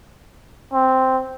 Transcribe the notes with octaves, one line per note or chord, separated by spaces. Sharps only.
C4